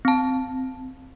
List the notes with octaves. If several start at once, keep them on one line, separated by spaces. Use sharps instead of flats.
C4 A5